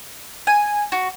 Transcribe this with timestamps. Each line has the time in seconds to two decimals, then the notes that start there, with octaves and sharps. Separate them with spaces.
0.47 G#5
0.92 F#4